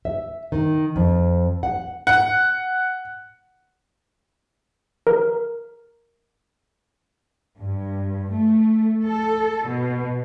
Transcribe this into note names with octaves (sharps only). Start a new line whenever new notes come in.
E5
D#3
F2
F#5
F#5
A#4
G2
A3
A4
B2